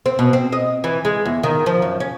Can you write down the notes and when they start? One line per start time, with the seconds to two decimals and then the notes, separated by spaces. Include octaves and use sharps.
0.06 C4
0.19 B2
0.33 C4
0.52 D#5
0.84 E3
1.05 G#3
1.26 E2
1.43 D#3
1.66 F3
1.82 F#2
2.00 C#4